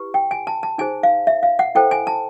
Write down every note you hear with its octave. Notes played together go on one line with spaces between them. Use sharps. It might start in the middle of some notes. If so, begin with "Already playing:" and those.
Already playing: E4 G4 B4
G5
G#5
A5
A5
D#4 G#4 C5 G#5
F5
E5
F5
F#5
E4 A4 C5 G5
G#5
A5